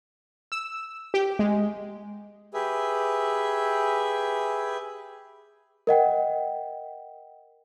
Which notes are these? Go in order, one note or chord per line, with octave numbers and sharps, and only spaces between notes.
E6
G4
G#3
G4 G#4 B4 E5
A#4 D#5 F#5 G5